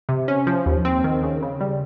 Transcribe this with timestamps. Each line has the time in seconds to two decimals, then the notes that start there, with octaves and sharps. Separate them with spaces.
0.09 C3
0.28 C#4
0.47 F3
0.66 D#2
0.85 C4
1.04 D#3
1.23 C#3
1.43 C#3
1.61 G3